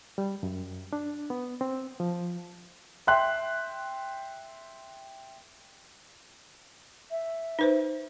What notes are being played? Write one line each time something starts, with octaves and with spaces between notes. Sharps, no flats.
G3
F#2
D4
B3
C4
F3
E5 G5 C6 F#6
E5
D#4 B4 C5